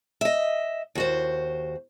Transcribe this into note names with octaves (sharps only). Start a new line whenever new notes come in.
D#5 E5
D#2 F#4 C5